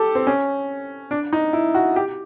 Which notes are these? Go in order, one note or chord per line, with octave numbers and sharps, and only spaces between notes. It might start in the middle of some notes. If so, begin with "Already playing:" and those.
Already playing: G4 A4
C4
C#4
D4
D#4
E4
F#4
G4